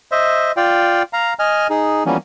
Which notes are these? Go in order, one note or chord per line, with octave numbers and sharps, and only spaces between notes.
C5 D#5 E5
F4 D5 F5 G5
F5 A#5
D#5 G#5 F6
D#4 G#4
E3 F3 G3 A#3 B3 C#4